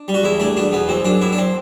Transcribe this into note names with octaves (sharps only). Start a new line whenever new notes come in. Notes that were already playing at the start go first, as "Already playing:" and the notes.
Already playing: D4
G3
F#4
E2 E4
A3 D4
B2 D4
E2 B3
F#2 C4
F#2 D4
F#2 E4
D4
C4